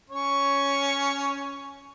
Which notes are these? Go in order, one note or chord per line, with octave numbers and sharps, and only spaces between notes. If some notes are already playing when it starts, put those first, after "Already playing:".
C#4 C#5 C#6